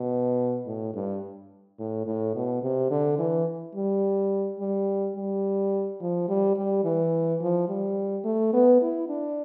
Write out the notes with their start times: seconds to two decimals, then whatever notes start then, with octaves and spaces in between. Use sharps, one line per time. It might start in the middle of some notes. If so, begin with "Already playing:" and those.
Already playing: B2
0.66 A2
0.94 G2
1.79 A2
2.06 A2
2.35 B2
2.62 C3
2.91 D3
3.19 E3
3.75 G3
4.60 G3
5.16 G3
6.00 F3
6.29 G3
6.56 G3
6.84 E3
7.41 F3
7.68 G3
8.25 A3
8.53 B3
8.82 E4
9.09 D4